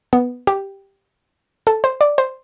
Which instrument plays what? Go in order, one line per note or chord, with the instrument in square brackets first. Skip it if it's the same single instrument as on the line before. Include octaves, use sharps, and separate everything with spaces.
[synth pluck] B3
G4
A4
C5
D5
C5